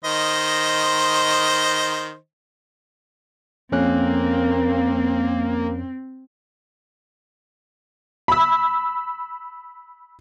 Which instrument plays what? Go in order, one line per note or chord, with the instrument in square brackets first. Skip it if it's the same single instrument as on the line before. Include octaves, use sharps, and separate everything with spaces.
[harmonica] D#3 C5 D#5
[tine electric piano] F2 C#4 F#6 [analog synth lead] A#3 [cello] C4
[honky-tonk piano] B5 E6